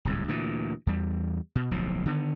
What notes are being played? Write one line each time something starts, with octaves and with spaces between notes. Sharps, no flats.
D1 C2 G#2
D2 A#2 E3
E2 G3
B2
D1 B1 A2 F3
D3 D#3 B3